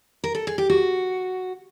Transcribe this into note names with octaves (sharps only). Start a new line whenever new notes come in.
A#4
A4
G#4
G4
F#4